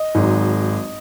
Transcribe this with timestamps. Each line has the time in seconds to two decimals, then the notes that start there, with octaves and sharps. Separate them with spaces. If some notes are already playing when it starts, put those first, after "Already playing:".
Already playing: D#5
0.15 G#1 G#2 F#3